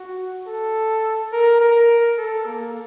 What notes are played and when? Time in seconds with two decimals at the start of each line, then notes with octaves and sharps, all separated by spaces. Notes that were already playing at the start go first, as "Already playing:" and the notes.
Already playing: F#4
0.47 A4
1.32 A#4
1.60 A#4
2.18 A4
2.47 A#3